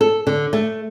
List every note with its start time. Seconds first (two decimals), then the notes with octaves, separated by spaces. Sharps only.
0.01 A4
0.27 D3
0.53 A3